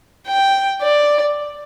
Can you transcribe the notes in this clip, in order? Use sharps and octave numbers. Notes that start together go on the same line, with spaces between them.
G5
D5